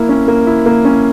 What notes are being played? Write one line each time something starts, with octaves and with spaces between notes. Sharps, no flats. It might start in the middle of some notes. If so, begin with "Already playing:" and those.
Already playing: A#3 E4
C#4
A#3
E4
A#3
C#4